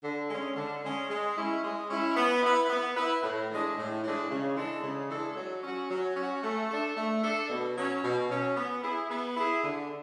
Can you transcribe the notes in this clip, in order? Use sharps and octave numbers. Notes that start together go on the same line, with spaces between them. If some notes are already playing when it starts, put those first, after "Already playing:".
D3
G#3 C#4
D3
G#3 C#4
G#3
C#4 E4
G#3
C#4 E4
B3
E4 B4
B3
E4 B4
A2
E3 G#3 D4
A2
E3 G#3 D4
C#3
E3 G#3 D4 A4
C#3
E3 G#3 D4 A4
F#3
C#4 F#4
F#3
C#4 F#4
A3
D4 A4
A3
D4 A4
B2
F#3 C#4
B2
F#3 C#4
B3
E4 G#4
B3
E4 G#4
D3